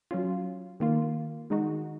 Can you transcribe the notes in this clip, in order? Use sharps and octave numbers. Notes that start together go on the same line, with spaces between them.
F#3 C#4 F4
D#3 A#3 F4
D#3 G#3 D#4 F#4